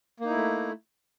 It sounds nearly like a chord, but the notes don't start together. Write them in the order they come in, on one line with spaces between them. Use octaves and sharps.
A#3 D#4 E4 A3